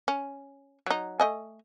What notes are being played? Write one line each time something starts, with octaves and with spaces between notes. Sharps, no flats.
C#4
F#3 D#4
A3 D#5 G#5